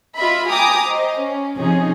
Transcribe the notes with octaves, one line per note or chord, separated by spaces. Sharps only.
F4 D#5 E5 B5
G5 G#5 A#5 D6 D#6
C5 D#5
C#4
C3 F3 C#4 D#4 G#4